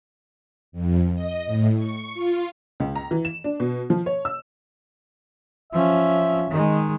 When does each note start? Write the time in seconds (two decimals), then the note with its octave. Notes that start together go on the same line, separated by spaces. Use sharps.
0.72 F2
1.14 D#5
1.46 A2
1.76 C#6
2.14 F4
2.80 C#2
2.96 A#5
3.11 E3
3.25 E7
3.44 D4
3.60 B2
3.90 F3
4.06 C#5
4.25 E6
5.72 F3 C#4 E5
6.50 D#3 G#3